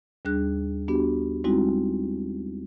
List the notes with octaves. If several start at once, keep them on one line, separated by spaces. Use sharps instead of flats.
D#2 G3 D4 G#4 F#6
B3 D4 F#4 G4
G3 G#3 C4 D#4 E4 F#4